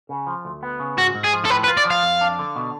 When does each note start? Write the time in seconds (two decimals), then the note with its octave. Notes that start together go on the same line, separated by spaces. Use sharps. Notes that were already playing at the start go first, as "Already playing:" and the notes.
0.09 C#3
0.27 F3
0.45 D2
0.63 B3
0.80 C#3
0.98 G#2 F#4
1.15 G#2
1.24 G#4
1.33 F3
1.45 A4
1.50 A2 B4
1.64 B4
1.68 F4
1.77 D5
1.85 F3
1.91 F5
2.03 F2
2.21 D4
2.39 D3
2.56 B2